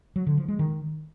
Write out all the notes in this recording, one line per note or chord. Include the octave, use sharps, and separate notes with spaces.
F#3
D3
F3
G#3
D#3